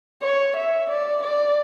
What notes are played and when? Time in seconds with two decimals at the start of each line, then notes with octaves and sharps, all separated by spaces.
0.22 C#5
0.56 E5
0.90 D5
1.23 D5